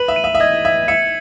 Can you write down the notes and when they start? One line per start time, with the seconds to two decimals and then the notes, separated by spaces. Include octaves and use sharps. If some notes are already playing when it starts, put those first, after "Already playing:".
Already playing: B4 F#7
0.08 E5
0.16 D#7
0.24 E5
0.35 E5
0.40 D#5 G#6
0.65 E5 G#6
0.88 E5 C#7